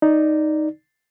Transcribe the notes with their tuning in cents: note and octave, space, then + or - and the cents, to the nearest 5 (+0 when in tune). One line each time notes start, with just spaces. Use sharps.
D#4 +0 D5 +0